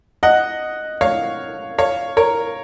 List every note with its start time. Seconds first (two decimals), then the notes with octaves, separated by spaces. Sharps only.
0.23 D#5 F#5
1.01 C#5 F5
1.78 C#5 F5
2.17 A#4 C#5